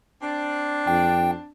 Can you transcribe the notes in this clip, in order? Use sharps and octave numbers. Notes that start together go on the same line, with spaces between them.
C4 D4
F2 G5